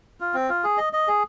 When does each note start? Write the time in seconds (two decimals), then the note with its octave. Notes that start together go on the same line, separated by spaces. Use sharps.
0.20 F4
0.34 C4
0.49 F4
0.64 G#4
0.78 D#5
0.93 D#5
1.08 G#4